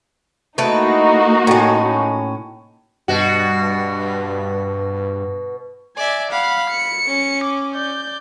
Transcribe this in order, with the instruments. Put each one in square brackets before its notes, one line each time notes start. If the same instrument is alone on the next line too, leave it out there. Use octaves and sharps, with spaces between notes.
[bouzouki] A3 E4 B4 [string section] A#3 D#4 F#4
[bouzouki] A2 C#4
[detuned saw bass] G2 [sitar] B2 F#4
[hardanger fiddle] D5 E5 [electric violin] G#5
[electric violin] F5 F#5 [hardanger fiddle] B5
[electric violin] C#7
[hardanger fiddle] C#4
[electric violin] D6
D5 G6